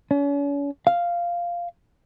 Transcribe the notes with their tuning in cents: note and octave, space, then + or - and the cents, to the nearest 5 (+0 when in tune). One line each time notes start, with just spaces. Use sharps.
C#4 +40
F5 -5